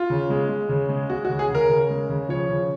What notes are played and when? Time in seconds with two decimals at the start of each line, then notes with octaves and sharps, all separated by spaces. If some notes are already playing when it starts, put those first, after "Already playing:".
Already playing: F4
0.10 C#3
0.30 G#3
0.49 G#3
0.69 C#3
0.89 G#3
1.10 G#3 F#4
1.25 F#4
1.29 C#3
1.39 G#4
1.50 C#3 A#4
1.70 C#3
1.90 G#3
2.09 C#3
2.29 F3 C#5
2.50 C#3